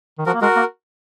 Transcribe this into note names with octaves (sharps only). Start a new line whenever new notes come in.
D#3
F3 F#4 A#4
A#3
G#3 F#4 A#4
A#3